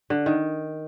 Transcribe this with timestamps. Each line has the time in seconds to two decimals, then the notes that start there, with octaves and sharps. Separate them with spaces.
0.10 D3
0.26 D#3